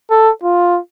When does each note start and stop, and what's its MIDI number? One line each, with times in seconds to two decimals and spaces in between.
0.11 0.30 69
0.43 0.79 65